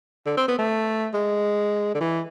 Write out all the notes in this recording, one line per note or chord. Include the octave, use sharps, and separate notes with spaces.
D3
C4
B3
A3
G#3
D3
E3